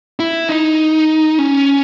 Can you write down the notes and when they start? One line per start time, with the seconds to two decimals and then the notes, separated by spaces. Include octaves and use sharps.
0.20 E4
0.49 D#4
1.39 C#4